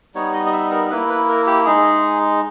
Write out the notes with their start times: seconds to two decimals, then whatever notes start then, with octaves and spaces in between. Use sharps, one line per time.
0.14 G3 B3 D#4 C#5
0.33 D#5
0.46 D#5
0.53 E5
0.71 A#4
0.90 A#3 E4 B4
1.09 B4
1.29 A#4
1.47 G4
1.65 G#3 D#4 G#4